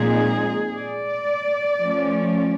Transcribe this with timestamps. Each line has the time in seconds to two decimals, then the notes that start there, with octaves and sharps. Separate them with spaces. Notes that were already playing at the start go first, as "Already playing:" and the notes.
Already playing: A#2 F3 G#3 C4 D#4 G#4
0.76 D5
1.83 F3 A3 C#4